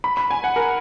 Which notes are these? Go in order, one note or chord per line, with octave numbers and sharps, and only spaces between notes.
B5
B5
G#5
F#5
A#4